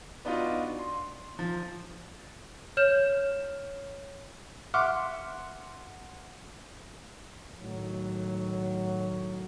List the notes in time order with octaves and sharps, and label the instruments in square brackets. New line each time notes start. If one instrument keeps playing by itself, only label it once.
[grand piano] B3 D4 D#4 F4 F#4
C6
F3
[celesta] C#5 F6 G6 E7
[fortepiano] E5 F#5 C6 D6 F6
[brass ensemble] A2 D#3 F#3